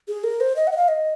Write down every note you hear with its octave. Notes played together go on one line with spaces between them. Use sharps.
G#4
A#4
C5
D#5
F#5
D#5
F5
D#5